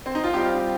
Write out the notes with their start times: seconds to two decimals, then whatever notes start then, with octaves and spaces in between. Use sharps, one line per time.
0.06 C4
0.15 D#4
0.24 F4
0.34 G3 C4 F4 G4